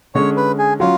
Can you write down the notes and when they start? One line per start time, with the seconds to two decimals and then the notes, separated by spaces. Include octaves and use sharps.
0.15 D3 G#3 C#4 C#5
0.37 B4
0.58 G#4
0.80 F#3 C#4 F4